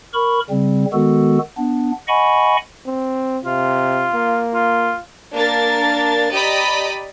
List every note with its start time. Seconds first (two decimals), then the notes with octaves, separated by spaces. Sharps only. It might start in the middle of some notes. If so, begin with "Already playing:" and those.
0.13 A#4 B5 C#6
0.50 C#3 G3 C4
0.93 D#3 G#3 B3 F#4 A4
1.58 B3 D4
2.08 D#5 F#5 G#5 B5 C#6
2.86 C4
3.45 C3 F4
4.14 A#3
4.54 F4
5.34 A#3 D4 A#4 A6
6.34 G4 D5 D#5 A#5 B5 D#6